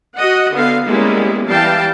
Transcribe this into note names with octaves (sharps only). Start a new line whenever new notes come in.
F#4 D#5 F#5
D3 B3 F5
G3 G#3 A#3 B3 C#4 E4
E3 G3 F5 G5 A5